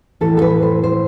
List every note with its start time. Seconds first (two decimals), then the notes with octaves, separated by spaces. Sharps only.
0.21 A2 E3 A4
0.37 A4
0.42 B4
0.62 C5
0.83 C5